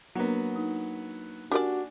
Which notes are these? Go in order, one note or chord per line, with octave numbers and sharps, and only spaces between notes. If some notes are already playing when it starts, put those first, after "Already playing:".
F#3 A#3 B3 D4 A#4
D#4
D4 F#4 G4 A#4 D5 G#5